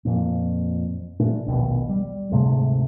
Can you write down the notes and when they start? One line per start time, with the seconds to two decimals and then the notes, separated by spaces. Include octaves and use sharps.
0.05 F2 A#2
1.19 A#2 A3 D4
1.47 A#1 D#2 B2
1.89 G3
2.31 D2 G#2 C3 A3